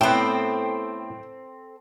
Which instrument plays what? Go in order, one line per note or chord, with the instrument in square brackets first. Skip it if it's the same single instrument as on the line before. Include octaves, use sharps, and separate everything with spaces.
[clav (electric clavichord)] A2 B3 [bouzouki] C4 A4 [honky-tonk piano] G5